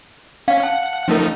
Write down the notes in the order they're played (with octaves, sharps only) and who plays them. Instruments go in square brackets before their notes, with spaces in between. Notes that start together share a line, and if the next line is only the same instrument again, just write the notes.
[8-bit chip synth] C#4 [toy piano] F5
[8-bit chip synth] F#5 [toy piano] A5
[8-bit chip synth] F3 A3 D#4 [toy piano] C#4 A#4